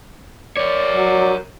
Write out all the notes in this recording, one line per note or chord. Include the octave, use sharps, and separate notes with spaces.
A#4 C#5 D5
F#3